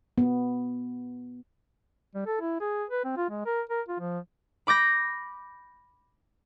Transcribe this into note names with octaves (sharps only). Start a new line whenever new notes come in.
B3
G3
A4
E4
G#4
B4
C4
F4
G#3
A#4
A#4
F4
F3
B5 D6 G6 A#6